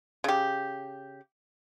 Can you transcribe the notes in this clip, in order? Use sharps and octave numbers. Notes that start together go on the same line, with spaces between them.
C#3 G4